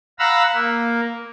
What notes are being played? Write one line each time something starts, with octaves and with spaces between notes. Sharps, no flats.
F5 F#5 A#5 B5 E6
A#3